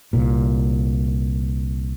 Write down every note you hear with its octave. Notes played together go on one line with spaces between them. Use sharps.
C2 A#2